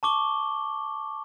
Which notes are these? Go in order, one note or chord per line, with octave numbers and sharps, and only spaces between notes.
A5 C#6 D6 G7